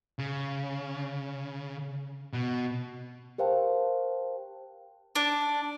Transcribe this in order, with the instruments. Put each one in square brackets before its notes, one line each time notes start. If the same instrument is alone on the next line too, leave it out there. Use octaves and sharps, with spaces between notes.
[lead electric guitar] C#3
B2
[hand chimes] G4 A#4 C5 F5 G5 A5
[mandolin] D4